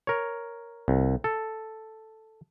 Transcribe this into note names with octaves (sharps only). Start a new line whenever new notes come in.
A#4 C#5
C2
A4